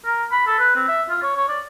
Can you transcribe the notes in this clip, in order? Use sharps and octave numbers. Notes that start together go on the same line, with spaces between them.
A#4
B5
A4
B4
C4
E5
F4
C#5
C#5
D5